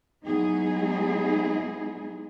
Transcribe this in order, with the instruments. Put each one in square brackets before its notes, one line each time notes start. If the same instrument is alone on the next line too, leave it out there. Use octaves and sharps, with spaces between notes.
[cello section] F#3 G#3 B3 D#4 E4 G#4